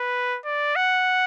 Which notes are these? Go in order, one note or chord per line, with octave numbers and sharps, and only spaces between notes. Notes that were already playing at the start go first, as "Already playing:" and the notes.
Already playing: B4
D5
F#5